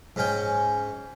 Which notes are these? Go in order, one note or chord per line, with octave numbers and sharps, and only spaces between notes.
G#2 C#4 G5